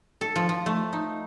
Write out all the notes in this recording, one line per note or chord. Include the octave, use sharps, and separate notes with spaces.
A4
F3
F3
A3
D#4